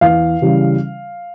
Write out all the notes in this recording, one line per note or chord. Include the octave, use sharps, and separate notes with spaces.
E2 F5
C#3 E3 G3